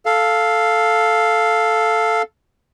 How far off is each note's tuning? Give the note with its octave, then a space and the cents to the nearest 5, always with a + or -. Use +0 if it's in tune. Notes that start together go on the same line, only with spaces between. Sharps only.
A4 +0 F5 +0